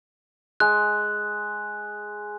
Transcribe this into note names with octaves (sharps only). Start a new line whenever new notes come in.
G#3 F#6